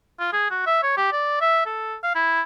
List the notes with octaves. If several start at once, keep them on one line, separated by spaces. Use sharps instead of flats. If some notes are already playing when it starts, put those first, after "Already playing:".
F4
G#4
F#4
E5
C#5
G4
D5
E5
A4
F5
E4